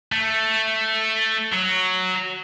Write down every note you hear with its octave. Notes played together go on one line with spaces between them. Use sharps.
A3
F#3